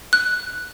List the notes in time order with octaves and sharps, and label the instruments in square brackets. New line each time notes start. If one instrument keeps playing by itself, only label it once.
[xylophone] F#6